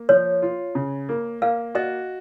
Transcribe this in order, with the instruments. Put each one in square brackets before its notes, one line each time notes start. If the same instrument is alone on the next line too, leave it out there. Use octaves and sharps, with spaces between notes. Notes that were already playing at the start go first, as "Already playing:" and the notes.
Already playing: [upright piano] A#3
[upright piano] F3 [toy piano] C#5
[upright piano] F4
C#3
A#3
[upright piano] A#3 [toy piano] F5
[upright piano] F#4 [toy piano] D#5